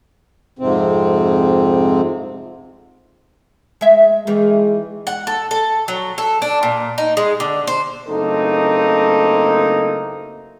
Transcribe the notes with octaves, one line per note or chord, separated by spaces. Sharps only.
F2 G#2 C3 C4
G#3 E5
E2 D#3 E3 G#3
F#5
A4
A4
F#3
A4
D4
A#2
D#4
G#3
D3
C5
F#1 A3 A#3 C4 D#4 A4